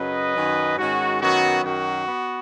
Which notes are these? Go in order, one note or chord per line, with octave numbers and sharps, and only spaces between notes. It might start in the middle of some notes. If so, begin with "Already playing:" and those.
Already playing: F#2 C#3 F#3 B4 D#5
F#2 D#3 F#3 C#4
G#2 D#3 G#3 C#4 F#4
F#2 D#3 F#3 B3 F#4
F#2 D#3 F#3 F#4
B3